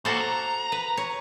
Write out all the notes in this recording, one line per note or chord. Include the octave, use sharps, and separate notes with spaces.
E2 A#3 F#4 A4 C5
A#5
B4
C#5